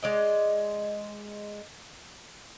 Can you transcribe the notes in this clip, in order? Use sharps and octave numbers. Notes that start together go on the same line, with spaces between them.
G#3 D5 D#5